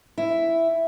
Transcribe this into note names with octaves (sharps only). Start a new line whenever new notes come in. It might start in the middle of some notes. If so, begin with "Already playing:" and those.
E4